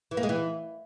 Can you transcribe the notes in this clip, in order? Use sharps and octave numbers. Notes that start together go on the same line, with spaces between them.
E3
A#3
G#3
E3